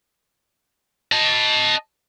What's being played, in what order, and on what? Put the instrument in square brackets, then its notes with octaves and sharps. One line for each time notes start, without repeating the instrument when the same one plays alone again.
[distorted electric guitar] D#5 A5